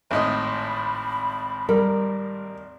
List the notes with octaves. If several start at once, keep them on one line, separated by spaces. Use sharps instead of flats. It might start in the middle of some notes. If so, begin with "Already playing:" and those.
G#1 A2 D#5 B5
G3 A#4